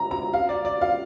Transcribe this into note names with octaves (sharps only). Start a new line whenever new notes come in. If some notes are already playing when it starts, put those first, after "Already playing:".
Already playing: A#5
A#5
F5
D5
D5
F5